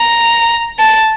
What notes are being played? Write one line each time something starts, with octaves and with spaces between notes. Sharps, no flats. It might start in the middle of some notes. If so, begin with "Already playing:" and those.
Already playing: A#5
A5